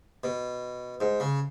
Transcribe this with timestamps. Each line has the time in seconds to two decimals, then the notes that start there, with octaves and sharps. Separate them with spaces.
0.24 B2
1.00 G#2
1.20 C#3